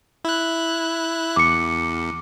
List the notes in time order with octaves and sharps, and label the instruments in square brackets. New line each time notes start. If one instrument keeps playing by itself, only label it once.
[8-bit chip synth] E4 F#6
[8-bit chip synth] E2 [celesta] D6 C#7